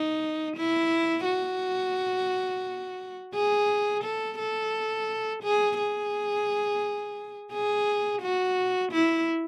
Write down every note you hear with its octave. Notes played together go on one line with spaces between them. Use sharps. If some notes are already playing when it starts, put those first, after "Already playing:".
Already playing: D#4
E4
F#4
G#4
A4
A4
G#4
G#4
G#4
F#4
E4